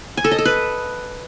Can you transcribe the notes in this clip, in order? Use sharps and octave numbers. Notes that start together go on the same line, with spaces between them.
G#5
A4
D#5
A4
B4